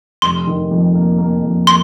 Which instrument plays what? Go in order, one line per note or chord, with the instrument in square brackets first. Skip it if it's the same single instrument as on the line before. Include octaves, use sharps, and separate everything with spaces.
[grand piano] F1 [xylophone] C6
[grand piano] D#3
F2
A#3
A#3
F2
[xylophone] C6